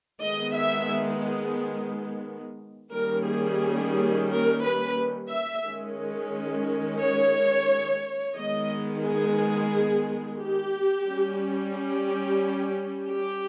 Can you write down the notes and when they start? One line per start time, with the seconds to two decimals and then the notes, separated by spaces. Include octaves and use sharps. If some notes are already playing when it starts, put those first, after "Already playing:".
0.22 D#3 G#3 B3 D#5
0.56 E5
2.93 D#3 G3 A#3 C#4 A#4
3.27 G#4
4.29 A#4
4.63 B4
5.30 E5
5.64 D#3 G#3 C#4
7.00 C#5
8.36 D#3 G#3 B3 D#5
9.04 G#4
10.39 G4
11.07 G3 C#4
11.75 G4
13.10 G4